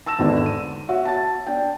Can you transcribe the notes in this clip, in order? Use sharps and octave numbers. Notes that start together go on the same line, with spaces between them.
A5 E6 A#6 E7
G#1 E2 D3 D5
D#7
F#4 C#5 E5 F#5
A5 A6
D4 G5